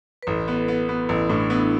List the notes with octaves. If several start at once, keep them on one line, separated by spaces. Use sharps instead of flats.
B4
A1 E4 A4
B3
B3
B3
A1 E4
A2 D4
D4
B3 E4